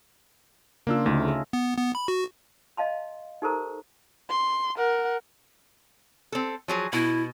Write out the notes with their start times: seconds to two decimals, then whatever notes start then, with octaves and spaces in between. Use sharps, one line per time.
0.87 C#3 A#3 D4 F4 E6
1.06 D2 C#3 A3 D#4
1.28 G#4
1.53 B3
1.78 B3
1.95 B5
2.08 F#4
2.77 D#5 F5 A5 C6
3.42 D#4 G4 A4 A#4 C5 A#5
4.30 C6
4.77 A#4 F#5
6.32 C4 A4
6.68 F3 F#3 G#4
6.93 B2 E4